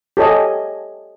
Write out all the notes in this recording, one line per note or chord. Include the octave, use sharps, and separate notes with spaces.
G4 A4 C#5 D#5 G#5